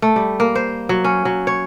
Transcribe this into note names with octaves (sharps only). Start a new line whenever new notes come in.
A3
G3
A#3
C5
F#3
C#4
F#3
C#5